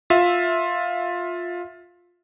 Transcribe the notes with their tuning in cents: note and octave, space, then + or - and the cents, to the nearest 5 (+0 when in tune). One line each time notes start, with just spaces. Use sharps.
F4 +10 E5 +0